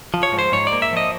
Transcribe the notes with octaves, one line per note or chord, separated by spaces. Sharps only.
F3
C#5
G#2
C5
G#2 C#5
D5
A#3
E5
F3 D#5